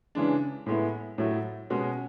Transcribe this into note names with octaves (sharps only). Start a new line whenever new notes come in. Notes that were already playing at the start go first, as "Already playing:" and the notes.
C#3 E3 G#3 D4
A2 G#3 B3 E4
A2 F#3 A3
B2 G#3 C#4 F#4